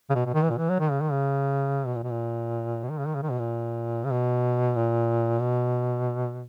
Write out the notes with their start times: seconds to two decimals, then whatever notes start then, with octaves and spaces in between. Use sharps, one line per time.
0.10 C#3
0.15 B2
0.26 B2
0.34 D#3
0.42 E3
0.50 A#2
0.58 E3
0.69 F#3
0.80 D#3
0.91 C#3
1.01 D#3
1.12 C#3
1.86 B2
1.95 A#2
2.03 B2
2.10 A#2
2.83 B2
2.90 D#3
2.99 C#3
3.07 D#3
3.15 C#3
3.23 D#3
3.31 B2
3.39 A#2
4.04 C#3
4.11 B2
4.76 A#2
5.40 B2